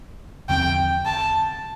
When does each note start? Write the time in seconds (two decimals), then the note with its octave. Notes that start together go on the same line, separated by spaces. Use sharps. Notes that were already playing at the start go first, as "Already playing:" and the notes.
0.49 E2 D3 F3 C4 G5
1.05 A5